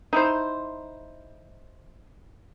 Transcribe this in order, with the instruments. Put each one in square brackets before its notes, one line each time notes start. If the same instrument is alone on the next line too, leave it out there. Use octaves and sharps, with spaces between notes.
[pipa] D#4 E4 C5